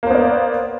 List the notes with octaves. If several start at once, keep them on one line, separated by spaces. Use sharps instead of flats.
A#3 B3 C5 D5